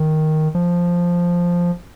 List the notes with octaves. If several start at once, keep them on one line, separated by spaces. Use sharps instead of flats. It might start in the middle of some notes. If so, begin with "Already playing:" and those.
Already playing: D#3
F3